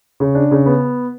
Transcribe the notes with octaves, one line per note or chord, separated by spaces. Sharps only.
C#3
D4
C#3
B3